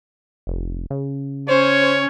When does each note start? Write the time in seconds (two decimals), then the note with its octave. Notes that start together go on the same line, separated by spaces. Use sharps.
0.47 F1
0.90 C#3
1.49 C#4 C5 C#5